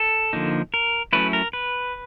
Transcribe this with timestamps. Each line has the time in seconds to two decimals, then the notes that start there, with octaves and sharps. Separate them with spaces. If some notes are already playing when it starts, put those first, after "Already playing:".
Already playing: A4
0.33 D3 F3 A#3 D#4
0.74 A#4
1.13 F#3 A3 C#4 E4 B4
1.33 A#4
1.53 B4